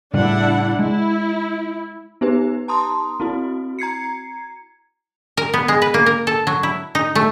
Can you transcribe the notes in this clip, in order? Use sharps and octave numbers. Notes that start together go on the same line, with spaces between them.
A2 C#3 G3 D4 E4 F#5
G#3 E4
B3 D#4 G4 B4
A5 A#5 C6 D#6
C4 E4 F#4
A#5 G#6 C7 C#7
A#4
B3
G#3
B4
A#3
A#4
A4
F#3
E4
D#4
A3